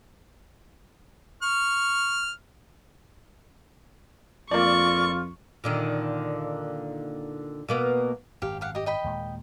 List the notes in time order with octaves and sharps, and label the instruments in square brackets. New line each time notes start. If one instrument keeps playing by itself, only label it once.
[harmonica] C#6 F6
[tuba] F2 [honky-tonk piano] A#3 D5 [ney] F4 [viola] C#6
[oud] A#2 D3 D#3
B2 A#3 B3
[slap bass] G#1 F#2 [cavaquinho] G4 F5
[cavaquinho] G4 F5 F#5
G4 D#5
D#5 G5 B5
[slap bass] D#2 A#2 G#3